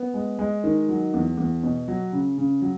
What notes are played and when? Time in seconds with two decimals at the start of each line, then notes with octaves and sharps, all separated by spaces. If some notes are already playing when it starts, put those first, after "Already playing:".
Already playing: B3
0.14 G#3
0.39 G#3
0.64 D#3
0.89 F#3
1.14 E2
1.38 E2
1.63 B2
1.88 F#3
2.12 C#3
2.38 C#3
2.62 F#3